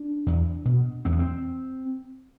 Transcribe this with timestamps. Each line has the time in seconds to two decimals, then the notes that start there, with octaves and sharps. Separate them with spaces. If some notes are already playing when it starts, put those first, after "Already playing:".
Already playing: D4
0.27 E2
0.65 B2
1.05 E2 C4
1.12 B3
1.19 C4